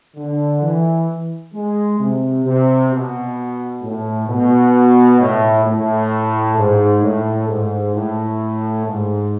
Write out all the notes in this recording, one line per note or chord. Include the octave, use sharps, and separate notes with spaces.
D3
E3
G#3
C3
C3
B2
A2
B2
A2
A2
G#2
A2
G#2
A2
G#2